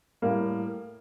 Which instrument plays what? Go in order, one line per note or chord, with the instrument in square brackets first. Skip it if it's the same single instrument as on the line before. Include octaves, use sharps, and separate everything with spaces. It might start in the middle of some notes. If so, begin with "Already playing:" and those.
[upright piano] A2 G3 A#3